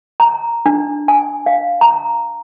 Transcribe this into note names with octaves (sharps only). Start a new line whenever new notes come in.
A#5
D4
G#5
F5
A#5